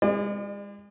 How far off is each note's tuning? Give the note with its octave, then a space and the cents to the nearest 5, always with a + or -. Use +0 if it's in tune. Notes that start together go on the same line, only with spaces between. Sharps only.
G#3 -35 D5 +40